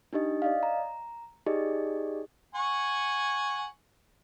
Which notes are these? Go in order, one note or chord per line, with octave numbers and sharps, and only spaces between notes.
D4 D#4 G4 D#5
D5 D#5 F5
A#5
D#4 G4 G#4 D5 D#5
F#5 G#5 C#6